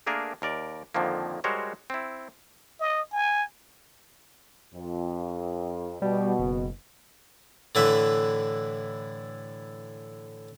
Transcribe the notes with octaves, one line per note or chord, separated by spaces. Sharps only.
A3 A#3 D4 G#4 A#4
D#2 A#4 D5
F2 D3 D#3 F3 A#3
G3 G#3 F#4 A#4 C5 C#5
C4 E4
D#5
G#5
F2
B2 G3
F#1
A2 D3 E3 B4 E5